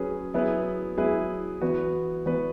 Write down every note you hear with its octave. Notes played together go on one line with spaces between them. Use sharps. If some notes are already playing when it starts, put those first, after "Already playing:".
Already playing: F#3 C#4 G#4 B4
F#3 B3 E4 G#4 B4
F#3 B3 E4 G#4 B4
E3 B3 F#4 B4
E3 B3 F#4 B4